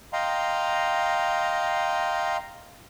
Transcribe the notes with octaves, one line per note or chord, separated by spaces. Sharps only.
D#5 F5 G5 A#5 C6